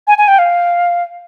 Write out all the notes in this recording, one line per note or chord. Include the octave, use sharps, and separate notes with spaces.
G#5
G#5
G5
F5